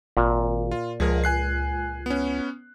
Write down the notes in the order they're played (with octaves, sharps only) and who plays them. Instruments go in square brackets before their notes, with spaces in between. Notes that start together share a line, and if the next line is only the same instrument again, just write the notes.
[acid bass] G#1 [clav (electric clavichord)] A#2
[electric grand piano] F4
[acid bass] C#2 [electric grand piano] F3 G#4 A#4
[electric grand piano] G#5 F#6 C7
B3 C#4